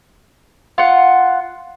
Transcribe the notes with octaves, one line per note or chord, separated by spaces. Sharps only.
F4 F#5